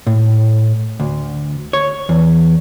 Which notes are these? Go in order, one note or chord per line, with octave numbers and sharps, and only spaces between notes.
A2
D2
C#5
E2